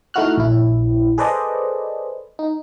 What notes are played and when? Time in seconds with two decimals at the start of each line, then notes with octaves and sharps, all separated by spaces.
0.14 A3 D#4 E4 F#4 F6 F#6
0.37 A#1 E4
1.18 G#4 A4 B4 C5 D5 D#5
2.39 D#4